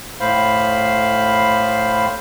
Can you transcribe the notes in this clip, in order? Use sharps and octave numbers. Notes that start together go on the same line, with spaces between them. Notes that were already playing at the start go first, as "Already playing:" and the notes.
A2 C5 F5 B5